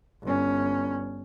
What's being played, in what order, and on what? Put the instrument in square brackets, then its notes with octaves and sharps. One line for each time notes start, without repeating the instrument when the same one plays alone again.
[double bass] G1 C#4